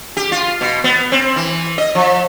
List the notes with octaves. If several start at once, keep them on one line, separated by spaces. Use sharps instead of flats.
G4
F4
B2
B3
C4
E3
D#5
F3